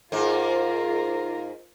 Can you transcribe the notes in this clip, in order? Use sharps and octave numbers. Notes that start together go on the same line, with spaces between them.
G#2 A#3 F4 A#4